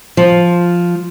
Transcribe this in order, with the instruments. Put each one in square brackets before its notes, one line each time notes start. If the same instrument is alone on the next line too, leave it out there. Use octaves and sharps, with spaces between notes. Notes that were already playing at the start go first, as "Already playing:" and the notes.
[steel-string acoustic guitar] F3